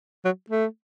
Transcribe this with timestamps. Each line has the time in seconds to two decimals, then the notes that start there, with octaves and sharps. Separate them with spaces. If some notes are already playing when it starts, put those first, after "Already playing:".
0.25 F#3
0.50 A3